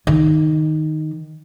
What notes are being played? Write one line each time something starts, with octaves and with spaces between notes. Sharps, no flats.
D#3